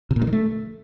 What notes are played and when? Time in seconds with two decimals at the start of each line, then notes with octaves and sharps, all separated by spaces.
0.11 C3
0.16 A#2
0.22 G2
0.27 D#3
0.33 A3